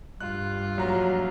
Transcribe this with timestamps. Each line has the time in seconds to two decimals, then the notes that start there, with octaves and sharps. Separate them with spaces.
0.20 G2 F4 F#6
0.78 A#1 F#3 A#5